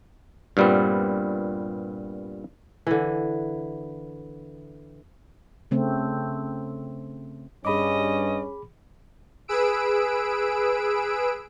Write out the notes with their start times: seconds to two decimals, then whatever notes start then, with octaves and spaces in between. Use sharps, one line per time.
0.57 G2 A#2 G3 B3 C4
2.87 D3 E3
5.71 C#3 A3 C4
7.65 G2 C#4 G#4 D#5 B5 D6
9.48 G#4 B4 E6 D7